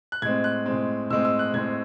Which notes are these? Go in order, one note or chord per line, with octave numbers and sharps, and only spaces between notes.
F#6
A2 G#3 C4 G#6
F#6
A2 G#3 C4
A2 G#3 C4 E6
E6
F#6
A2 G#3 C4 G#6